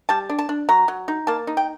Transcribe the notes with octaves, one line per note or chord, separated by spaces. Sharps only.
G3 A5
D4
A5
D4
F#3 A#5
F#3
D#4
A#3 A5
D#4
G5